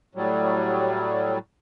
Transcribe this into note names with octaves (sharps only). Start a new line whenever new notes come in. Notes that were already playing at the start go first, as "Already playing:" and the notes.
A2 F#3 G3